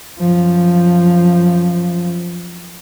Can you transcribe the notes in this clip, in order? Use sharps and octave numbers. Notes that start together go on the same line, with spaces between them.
F#2 F3